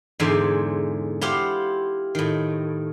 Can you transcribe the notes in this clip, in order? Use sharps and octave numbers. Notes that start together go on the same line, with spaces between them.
E2 G#2 D3 C5 E5 G#5
E4 F4 G4 C5 F5 F#5
A2 D#3